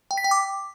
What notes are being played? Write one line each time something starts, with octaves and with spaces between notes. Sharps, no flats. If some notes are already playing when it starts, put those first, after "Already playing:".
G5
B6
G5
D6